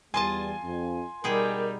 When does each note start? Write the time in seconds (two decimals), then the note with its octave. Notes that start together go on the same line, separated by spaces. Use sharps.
0.14 E2 G3 F4 D#5 G#5 A5 C6
0.64 F2
1.24 B2 G3 D#4 G#4 A#4 G5